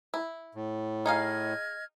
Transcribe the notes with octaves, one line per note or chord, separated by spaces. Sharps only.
E4
A2
D#4 G#4 D#5 F5 F6 G#6